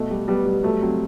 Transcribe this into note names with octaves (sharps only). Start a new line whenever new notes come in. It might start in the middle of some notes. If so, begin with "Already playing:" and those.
Already playing: B2 A3
G3
G3 B3
G3
F#3 A3
F#3 C4